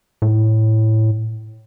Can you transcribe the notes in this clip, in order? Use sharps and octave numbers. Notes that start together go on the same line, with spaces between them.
A2